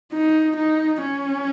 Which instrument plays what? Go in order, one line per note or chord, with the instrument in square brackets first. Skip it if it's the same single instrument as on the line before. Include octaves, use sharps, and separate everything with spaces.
[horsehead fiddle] D#4
D#4
C#4